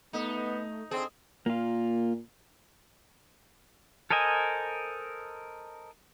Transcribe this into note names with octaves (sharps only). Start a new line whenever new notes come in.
A3 B3 D#4
D3 C4 G#4
A#2 A#3 F4
A4 A#4 C5 D#5 G#5